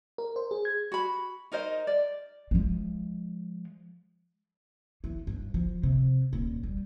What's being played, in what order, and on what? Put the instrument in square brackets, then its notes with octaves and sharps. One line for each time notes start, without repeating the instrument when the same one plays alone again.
[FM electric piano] A#4
C5
G#4
G#6
[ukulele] F#4 B5
D#4 A#4 C5 D#5
D5
[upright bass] F3 G#3
E3
G2
F3
C3
D#1
G3